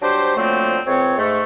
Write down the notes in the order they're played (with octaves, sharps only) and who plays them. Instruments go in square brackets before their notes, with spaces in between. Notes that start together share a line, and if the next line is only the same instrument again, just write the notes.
[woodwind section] F#3 G3 D4 G4 C5
D3 F3 F#3 A3 A#3 C4
C#2 C4 C#5
G#2 A3